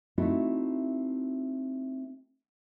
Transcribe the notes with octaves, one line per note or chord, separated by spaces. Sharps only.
A3 C4 D#4 E4 F#4